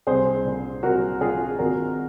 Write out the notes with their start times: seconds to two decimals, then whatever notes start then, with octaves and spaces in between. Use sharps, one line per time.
0.07 C2 G#4 C5
0.45 A#2
0.83 C2 F#4 A#4
1.21 A#2 F4 G#4
1.59 G#1 F#4 A#4